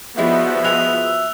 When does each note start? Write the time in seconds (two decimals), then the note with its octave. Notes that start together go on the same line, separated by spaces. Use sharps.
0.18 F3 G3 G#3 B3 E4 F#4 E5
0.64 G#3 G#5 E6 F#6 F7